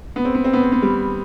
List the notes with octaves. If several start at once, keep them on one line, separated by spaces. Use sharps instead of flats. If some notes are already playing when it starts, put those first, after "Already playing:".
B3
C4
B3
C4
B3
C4
B3
G3